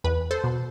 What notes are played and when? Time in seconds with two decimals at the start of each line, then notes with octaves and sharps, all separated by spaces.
0.04 E2 B4
0.31 A4 C5
0.44 B2